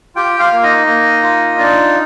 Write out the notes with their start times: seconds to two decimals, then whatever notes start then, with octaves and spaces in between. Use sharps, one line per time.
0.16 F4 G4 G5
0.40 F4 F5
0.52 A#3
0.63 D#4 D#5
0.87 A#3
1.23 F4
1.59 D4 D#4 D5